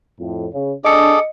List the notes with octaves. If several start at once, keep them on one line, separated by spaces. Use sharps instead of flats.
F2 A2
C#3
D4 G#4 A4 D#5 D6 C#7